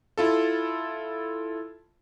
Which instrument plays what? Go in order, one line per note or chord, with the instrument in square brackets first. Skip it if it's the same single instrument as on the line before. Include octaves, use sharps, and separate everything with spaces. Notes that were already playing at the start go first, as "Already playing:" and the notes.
[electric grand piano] E4 F4 A4